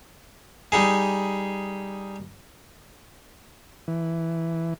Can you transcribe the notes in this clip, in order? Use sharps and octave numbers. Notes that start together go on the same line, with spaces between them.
G3 D#4 G#4
E3